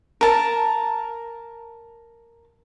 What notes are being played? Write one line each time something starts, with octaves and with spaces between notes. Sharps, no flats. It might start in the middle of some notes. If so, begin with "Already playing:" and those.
A#4 A5